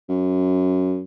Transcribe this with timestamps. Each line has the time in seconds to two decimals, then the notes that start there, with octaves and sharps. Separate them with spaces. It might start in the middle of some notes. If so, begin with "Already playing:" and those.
0.09 F#2